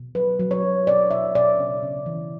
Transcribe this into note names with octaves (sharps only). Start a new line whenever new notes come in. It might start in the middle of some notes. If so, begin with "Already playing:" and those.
Already playing: B2
F#3 B4
F#3
C#5
F#3
B2 D5
B2 E5
B2 D5
C#3
C#3
E3